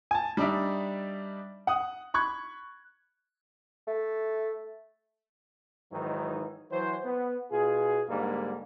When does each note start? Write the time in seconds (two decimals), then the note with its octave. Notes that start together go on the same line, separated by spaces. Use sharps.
0.11 G#5 A5
0.37 G3 D4 D#4 D5 E5
1.67 F#5 D#6 F#6
2.14 B5 C#6 F#6 G#6
3.87 A3
5.93 G#2 D#3 E3 F#3 D#4
6.72 E3 F#3 C5
7.05 B3
7.52 B2 F4 G#4
8.09 G#2 D3 G3 A#3